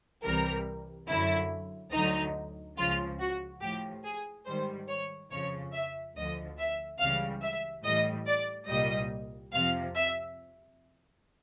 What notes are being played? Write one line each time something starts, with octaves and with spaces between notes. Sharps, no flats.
C2 C3 E3 G3 A#4
F#2 D3 F#3 E4
D2 D3 F#3 D#4
C#2 C#3 F3 F4
F#4
A2 F3 G4
G#4
G#2 D#3 G3 C5
C#5
F2 C#3 F3 C#5
E5
D2 D3 F3 D#5
E5
C#2 C#3 E3 G3 F5
E5
A2 E3 G3 D#5
D5
C2 A#2 G3 D#5
F2 C3 F3 F5
E5